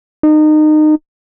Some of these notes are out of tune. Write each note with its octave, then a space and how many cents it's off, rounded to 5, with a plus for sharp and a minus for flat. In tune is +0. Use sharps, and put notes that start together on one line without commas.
D#4 -25